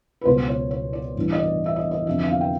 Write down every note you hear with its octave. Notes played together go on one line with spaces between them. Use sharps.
B4
C#2 B2 F#3 C5
C#5
C#5
D5
A1 G2 E3
D#5
D5
E5
D#5
D#5
F2 D3 F3 E5
E5
F5
G5